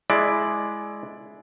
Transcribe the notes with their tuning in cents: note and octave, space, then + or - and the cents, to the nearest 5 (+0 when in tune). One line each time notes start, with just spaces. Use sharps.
G#3 +15 E4 +0 D5 +10